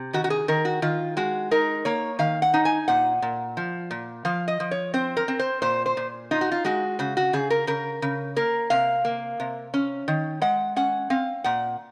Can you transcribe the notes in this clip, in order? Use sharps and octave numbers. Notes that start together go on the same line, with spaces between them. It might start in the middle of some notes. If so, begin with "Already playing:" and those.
Already playing: C3
D#3 F#4
F#4
G#4
D#3 A#4
F#4
D#3 F4
G#3 F#4
D#4 A#4
A#3 C#5
D#3 F5
F#5
D#4
G#5
A#2 F#5
A#2
F3
A#2
F3 F5
D#5
F3
C#5
C4 C5
A#4
C4
C5
A#2 C5
C5
A#2
D#4 F4
F#4
F4
G#3 F#4
C#3 F#4
F#4
C#3 G#4
A#4
C#3 A#4
C#3
A#3 A#4
C3 F5
A#3
C3
C#4
D#3
G#3 F#5
C#4 F#5
C4 F5
A#2 F#5